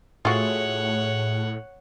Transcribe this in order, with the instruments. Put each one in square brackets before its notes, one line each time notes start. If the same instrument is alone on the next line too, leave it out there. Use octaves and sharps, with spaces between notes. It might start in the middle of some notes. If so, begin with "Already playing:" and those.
[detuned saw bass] A2 [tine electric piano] A3 G#4 [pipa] F4 F#4 [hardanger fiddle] C#5 F#5